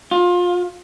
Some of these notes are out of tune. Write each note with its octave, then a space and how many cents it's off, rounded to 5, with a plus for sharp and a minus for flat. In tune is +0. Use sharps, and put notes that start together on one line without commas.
F4 +25